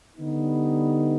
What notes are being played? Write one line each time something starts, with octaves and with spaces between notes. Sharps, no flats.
D3 G3 B3 D#4